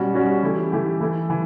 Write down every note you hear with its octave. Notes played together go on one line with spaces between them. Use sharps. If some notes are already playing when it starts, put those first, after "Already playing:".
Already playing: B2 G3 C#4 F#4
B2 G3 C#4 F#4
E3 A3 E4 G4
E3 A3 E4 G4
E3 A3 E4
E3